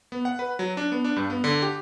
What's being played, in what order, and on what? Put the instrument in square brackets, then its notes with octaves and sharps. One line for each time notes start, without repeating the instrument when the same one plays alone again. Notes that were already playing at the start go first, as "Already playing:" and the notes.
[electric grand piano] B3
F#5
B4
F#3
D4
B3
D4
G2
B3
D3
G4